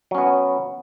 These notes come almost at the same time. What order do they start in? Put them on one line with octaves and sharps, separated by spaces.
F#3 C#4 B3